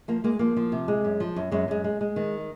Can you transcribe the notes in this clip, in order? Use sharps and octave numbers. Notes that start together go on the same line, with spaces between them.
F3 A#3
G#3 A#3
F3 A#3
F3
C3
G#3
F#2
F3
F#2
F#2 G#3
F#2 G#3
G#3
G#3
D#3